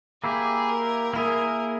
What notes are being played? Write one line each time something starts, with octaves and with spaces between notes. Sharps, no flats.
A#3 E4 G4 G#4
A#4
A#3 E4 G#4 A#4